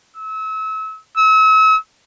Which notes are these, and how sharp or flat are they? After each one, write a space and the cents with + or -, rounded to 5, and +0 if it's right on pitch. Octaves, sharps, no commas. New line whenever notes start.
E6 -35
E6 -40